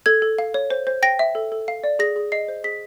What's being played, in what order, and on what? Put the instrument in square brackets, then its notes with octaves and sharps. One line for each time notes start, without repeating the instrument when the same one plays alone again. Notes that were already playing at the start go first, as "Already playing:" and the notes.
[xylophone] A4 G#6
A4
F5
C#5
C5
C5
G5 A#6
E5
A4
A4
F5
D5
G#4 A#6
G#4
D#5 C7
C5
G#4 B6